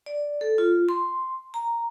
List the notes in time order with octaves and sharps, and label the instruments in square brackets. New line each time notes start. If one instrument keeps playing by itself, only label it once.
[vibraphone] D5
A4
F4
C6
A#5